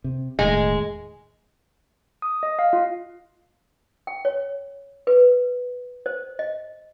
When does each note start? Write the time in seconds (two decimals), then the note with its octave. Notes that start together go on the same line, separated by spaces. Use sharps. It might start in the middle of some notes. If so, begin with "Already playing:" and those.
0.04 C3
0.39 E1 A2 D#3 G#3
2.22 D#6
2.43 D#5
2.59 F5
2.73 F4
4.07 G5
4.25 C#5
5.07 B4
6.06 C5
6.39 D#5